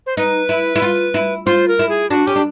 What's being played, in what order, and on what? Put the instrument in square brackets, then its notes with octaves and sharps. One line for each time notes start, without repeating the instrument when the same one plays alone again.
[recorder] C5
[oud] D#4 [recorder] B4
[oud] E4
E4
F4
E4
[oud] F4 [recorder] C5
[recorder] A#4
[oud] E4
[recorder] G#4
[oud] D4 [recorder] F#4
[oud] C#4 [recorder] G4
[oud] D4